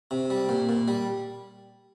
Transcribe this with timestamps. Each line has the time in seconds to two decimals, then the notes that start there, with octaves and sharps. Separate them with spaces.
0.11 C3
0.30 G3
0.49 A#2
0.69 A#2
0.88 G3